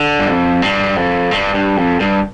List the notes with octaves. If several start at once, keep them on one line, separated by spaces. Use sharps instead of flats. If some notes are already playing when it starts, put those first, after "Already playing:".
Already playing: D3
G2
F2
G2
F2
G2
G2
F2
G2